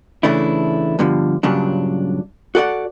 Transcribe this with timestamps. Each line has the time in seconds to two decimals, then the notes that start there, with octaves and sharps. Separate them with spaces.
0.23 C#3 E3 A3 D4 E4
0.99 G2 B2 D3 F3
1.43 G2 A#2 C#3 F#3 D4
2.55 F#4 A4 D5 F#5